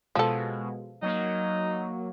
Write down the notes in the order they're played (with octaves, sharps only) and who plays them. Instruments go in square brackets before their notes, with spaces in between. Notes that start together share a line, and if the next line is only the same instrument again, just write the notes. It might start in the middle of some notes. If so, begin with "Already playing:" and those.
[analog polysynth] B2 G#3 [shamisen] F3 A4
[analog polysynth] F#3 A#3 [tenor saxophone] D#4